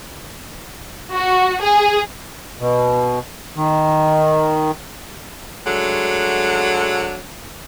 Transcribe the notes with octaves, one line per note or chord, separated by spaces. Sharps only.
F#4
G#4
B2
D#3
F#3 G#3 A3 D4 A4 F#5